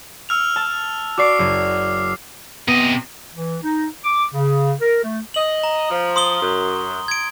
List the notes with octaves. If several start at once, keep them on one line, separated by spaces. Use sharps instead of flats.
E6 F6 F7
A5
F#4 D5 C#6 D6 C7
F#1
C3 B3 D#5
E3
D#4
D6
C#3
A#4
A3
D#5 F#7
A#5
F3
C6 D#6 G7
F#2
G#6 D7